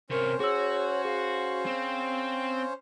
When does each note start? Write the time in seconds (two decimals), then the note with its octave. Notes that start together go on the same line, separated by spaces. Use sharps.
0.10 C3 C#4 A#4 C5 C#5
0.40 F#4 G#4 C#5 E6
1.05 G#4 F5
1.66 C4